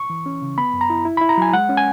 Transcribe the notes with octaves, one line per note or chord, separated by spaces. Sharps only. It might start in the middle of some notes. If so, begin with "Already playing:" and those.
Already playing: C#6
E3
C#4
C#3
B3 B5
F#2
A#5
E4
E4
E4 B5
A#5
F#3 G#5
G#3 F#5
C#4
G#5